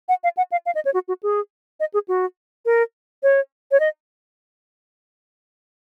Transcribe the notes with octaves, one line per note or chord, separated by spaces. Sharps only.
F#5
F5
F#5
F5
F5
D#5
C#5
F#4
F#4
G#4
D#5
G#4
F#4
A#4
C#5
C#5
D#5